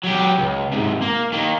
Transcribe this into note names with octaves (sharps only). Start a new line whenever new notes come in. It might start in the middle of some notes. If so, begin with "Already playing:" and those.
F#3 G4
C#2
G#2 C3
A#3
D#3 A#3